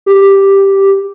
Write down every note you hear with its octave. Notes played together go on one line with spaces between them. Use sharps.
G4